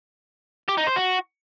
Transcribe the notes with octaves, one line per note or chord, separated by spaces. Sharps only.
G4
D#4
C5
F#4